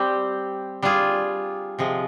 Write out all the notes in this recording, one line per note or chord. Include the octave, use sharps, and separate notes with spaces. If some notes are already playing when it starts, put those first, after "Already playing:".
Already playing: G3 C4 G4
G3 D4 F4 G#4
C3 F3 G#3